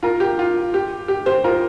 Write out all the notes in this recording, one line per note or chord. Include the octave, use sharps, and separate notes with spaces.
F4 A#4
G4
F4
G4
G4
G4 C5
F4 A#4